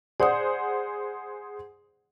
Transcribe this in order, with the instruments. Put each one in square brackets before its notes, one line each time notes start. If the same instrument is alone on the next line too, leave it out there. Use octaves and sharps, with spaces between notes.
[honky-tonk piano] G#4 C5 F#5 [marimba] D5 D#6